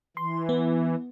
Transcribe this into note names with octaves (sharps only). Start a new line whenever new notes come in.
E3 C6
B3